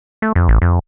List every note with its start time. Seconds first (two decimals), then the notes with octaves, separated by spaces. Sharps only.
0.22 A3
0.35 F2
0.48 A1
0.62 F2